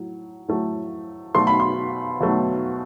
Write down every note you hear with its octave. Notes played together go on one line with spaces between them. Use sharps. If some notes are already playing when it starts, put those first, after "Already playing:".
Already playing: A2 F#3
A2 F#3 A3
B2 F#3 A3 C6
B5
C6
B2 F#3 A3